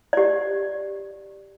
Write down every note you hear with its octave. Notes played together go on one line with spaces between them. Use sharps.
G4 D5